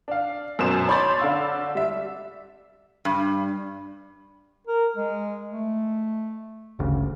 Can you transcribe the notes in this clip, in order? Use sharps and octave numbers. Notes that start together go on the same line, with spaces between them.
D4 F5
F#2 B2 C5 E7
C#5 B5 C6 D6 G6 A6
D3 F5 E6
G3 E5
G2
A#4
G#3
A3
G1 D2 C#3